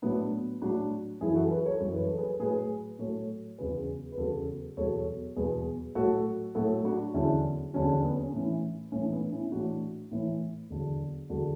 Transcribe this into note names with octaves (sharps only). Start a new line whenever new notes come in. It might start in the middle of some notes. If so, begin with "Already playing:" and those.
A2 F#3 B3 D4
A2 F#3 D4 F#4
F#2 E3 E4 G#4
F#4 A4
G#4 B4
A4 C#5
F#2 E3 C#5
B4
A4
G#4 B4
A2 F#3 G#4 B4
A2 F#3 A4 C#5
E2 C#3 F#3 G#4 B4
B4
E2 C#3 F#3 F#4 A4
E2 B2 F#3 A4 C#5
E2 B2 F#3 G#4 B4
A2 F#3 F#4 A4
A2 F#3 F#4 A4
D4 F#4
E2 D3 F#3 C#4 E4
E2 D3 F#3 C#4
C#4
B3
C#4
A2 E3
A2 E3 C#4
B3 D4
C#4 E4
A2 E3 D4 F#4
A2 E3
E2 D3 F#3
E2 D3 F#3 F#4 A4